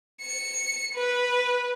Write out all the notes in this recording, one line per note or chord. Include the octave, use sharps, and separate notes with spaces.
C#7
B4